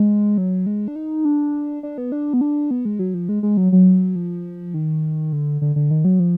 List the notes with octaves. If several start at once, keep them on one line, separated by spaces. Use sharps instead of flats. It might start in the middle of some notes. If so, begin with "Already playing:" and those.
Already playing: G#3
F#3
G#3
D4
D#4
D4
D4
B3
D4
B3
D4
B3
G#3
F#3
F3
G#3
G#3
F#3
F#3
F3
D#3
D3
D3
D3
D#3
F#3
F3